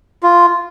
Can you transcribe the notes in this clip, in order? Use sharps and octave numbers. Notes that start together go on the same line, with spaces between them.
F4